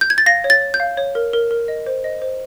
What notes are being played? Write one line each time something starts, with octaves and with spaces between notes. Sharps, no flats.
G6
G#6
A6
F5 A#6
C#5
A6
C#5
G6
F5
C#5
A#4
A#4
A#4
D#5
C5
D#5
C5